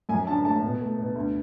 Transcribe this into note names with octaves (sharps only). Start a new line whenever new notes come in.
F#2 G#5
D3 A5
A3 A5
B2
A3
B2
D2